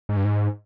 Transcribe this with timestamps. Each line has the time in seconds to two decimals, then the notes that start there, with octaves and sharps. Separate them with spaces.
0.09 G#2
0.17 G2
0.25 G#2